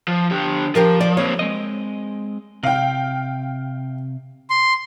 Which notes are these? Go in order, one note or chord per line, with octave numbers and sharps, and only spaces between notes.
F3
D3 G4
F3 G4 A#4 F5
D5
A#3 C4 C#5
G#3 C4 D#5
C3 F5 G5
C6